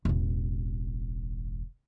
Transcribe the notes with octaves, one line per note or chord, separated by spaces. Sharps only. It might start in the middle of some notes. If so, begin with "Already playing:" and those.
E1 A1